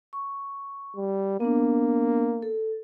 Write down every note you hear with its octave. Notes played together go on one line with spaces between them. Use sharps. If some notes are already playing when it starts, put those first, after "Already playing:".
C#6
G3
A#3 B3 D4
A4